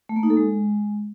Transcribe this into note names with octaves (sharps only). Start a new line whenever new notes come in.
A3
A#3
D#4
A4
G#3